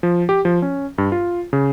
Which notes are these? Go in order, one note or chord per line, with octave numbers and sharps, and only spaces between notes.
F3
G4
F3
C#4
G2
F4
C#3